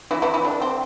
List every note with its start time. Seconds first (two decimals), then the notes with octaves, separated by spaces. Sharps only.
0.11 E3 E4
0.22 E3 E4
0.34 E3 E4
0.45 D3 D4
0.62 C4